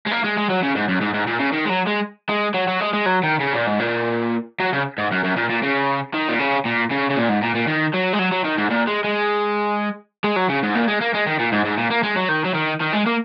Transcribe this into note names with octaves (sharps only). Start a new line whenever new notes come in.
G#3
A#3
G#3
G#3
F#3
C#3
G#2
F#2
G#2
G#2
A#2
C#3
D#3
G#3
F#3
G#3
G#3
F#3
F#3
G#3
G#3
F#3
D#3
C#3
A#2
G#2
A#2
F#3
C#3
G#2
F#2
F#2
A#2
A#2
C#3
D#3
A#2
C#3
A#2
C#3
C#3
A#2
G#2
A#2
A#2
D#3
F#3
G#3
F#3
F#3
D#3
G#2
A#2
G#3
G#3
G#3
F#3
C#3
G#2
A#2
G#3
A#3
G#3
D#3
A#2
G#2
G#2
A#2
A#3
G#3
F#3
D#3
F#3
D#3
D#3
G#3
A#3